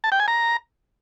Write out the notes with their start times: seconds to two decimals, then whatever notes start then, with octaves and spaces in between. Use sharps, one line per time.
0.04 A5
0.12 G5
0.20 G#5
0.28 A#5